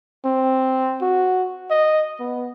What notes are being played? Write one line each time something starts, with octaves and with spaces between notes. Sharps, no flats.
C4
F#4
D#5
B3